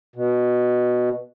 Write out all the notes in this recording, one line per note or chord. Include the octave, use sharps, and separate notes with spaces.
B2